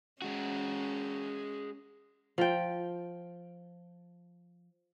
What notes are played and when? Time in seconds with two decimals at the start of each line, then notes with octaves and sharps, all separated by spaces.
0.22 G#3 C#4 F#4
2.38 F3 G5